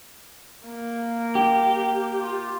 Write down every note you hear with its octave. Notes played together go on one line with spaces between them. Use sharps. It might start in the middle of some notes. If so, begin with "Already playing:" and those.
A#3
G4
F4